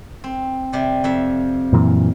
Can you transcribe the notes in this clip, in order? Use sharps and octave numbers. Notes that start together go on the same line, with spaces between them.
C4
C3 G3
F2 E5
F#2 A#2 E3